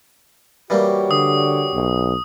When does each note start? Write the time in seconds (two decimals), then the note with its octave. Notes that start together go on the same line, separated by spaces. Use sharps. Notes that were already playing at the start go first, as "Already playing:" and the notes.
0.70 E3 G3 A#3 F#4 G4 C#5
1.11 D3 D#6
1.73 B1